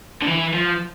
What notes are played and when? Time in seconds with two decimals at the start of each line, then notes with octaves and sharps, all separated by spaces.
0.22 D3
0.27 E3
0.54 F3